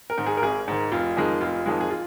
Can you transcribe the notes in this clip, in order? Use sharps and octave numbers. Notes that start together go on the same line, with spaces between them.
A#4
G#2 D#3
G#4
A#4
G#1 G#4
G#2 D#3
F1 F4
F2 D#3 G#3
F1 F4
F2 D#3 G#3
G#4
F4